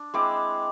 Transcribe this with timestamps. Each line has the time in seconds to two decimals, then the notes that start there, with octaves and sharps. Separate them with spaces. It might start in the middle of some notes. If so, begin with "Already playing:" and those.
Already playing: D4
0.14 G#3 C4 E4 D6